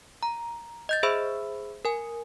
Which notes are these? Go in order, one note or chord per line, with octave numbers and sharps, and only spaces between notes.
A#5
D#5 G6 A6
G#4 C5 E5 B5 E6
A#4 G#5